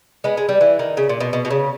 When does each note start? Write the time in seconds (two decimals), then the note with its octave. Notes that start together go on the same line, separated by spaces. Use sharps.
0.24 G#3 B3
0.37 G#3
0.49 G3
0.61 E3
0.79 D#3
0.97 C#3
1.09 A#2
1.20 B2
1.33 B2
1.45 B2
1.50 C#3